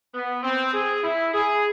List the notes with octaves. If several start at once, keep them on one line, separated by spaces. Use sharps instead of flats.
B3
C4
G#4
E4
G#4